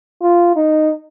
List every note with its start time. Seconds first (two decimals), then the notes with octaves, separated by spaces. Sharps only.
0.22 F4
0.56 D#4